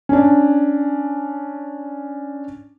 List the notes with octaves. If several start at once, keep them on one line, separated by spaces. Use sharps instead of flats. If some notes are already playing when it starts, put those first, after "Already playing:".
C#4 D4